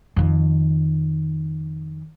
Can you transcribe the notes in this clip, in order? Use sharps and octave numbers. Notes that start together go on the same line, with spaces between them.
F2 D#3